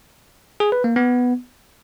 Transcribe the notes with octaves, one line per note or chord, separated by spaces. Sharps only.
G#4
B4
A#3
B3